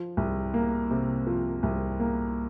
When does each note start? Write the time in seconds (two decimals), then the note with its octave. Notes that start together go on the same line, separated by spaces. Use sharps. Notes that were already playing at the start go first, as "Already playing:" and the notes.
Already playing: F3
0.17 C2
0.54 A#3
0.91 C3
1.27 F3
1.63 C2
2.00 A#3